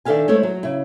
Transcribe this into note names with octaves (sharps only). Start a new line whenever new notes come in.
D#3 D4 A4 E5 F5 G#5
G#3 A3 E4 A4 C5 C#5
F#3
C#3 E4